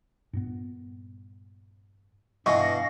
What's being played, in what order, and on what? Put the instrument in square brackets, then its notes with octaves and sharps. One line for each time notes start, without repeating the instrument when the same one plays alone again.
[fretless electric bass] G2 A#2 B3
[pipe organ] G2 F5 A#6 [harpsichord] B2 E3 [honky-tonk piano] C#6